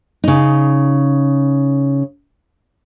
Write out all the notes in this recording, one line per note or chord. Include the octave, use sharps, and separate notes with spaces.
C#3 D#4